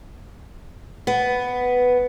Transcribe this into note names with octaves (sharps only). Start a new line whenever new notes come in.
B3